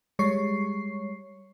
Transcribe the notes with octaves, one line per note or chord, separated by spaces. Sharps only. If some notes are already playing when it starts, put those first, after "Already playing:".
G3 G#3 C#5 C#6 C7